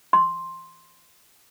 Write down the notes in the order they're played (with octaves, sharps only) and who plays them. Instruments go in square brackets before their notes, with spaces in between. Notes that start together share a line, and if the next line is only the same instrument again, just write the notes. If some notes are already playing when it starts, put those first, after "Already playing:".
[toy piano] C6